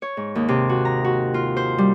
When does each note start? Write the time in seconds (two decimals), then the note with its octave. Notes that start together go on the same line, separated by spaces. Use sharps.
0.02 C#5
0.17 G#2
0.35 D#2
0.49 C3
0.69 F#4
0.85 A#5
1.04 F#4
1.34 F4
1.57 C5
1.78 G3